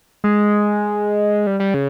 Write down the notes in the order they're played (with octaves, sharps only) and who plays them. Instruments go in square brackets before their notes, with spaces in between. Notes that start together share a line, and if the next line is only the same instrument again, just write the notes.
[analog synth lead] G#3
G3
G3
C#3